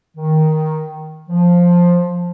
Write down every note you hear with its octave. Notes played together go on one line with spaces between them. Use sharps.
D#3
F3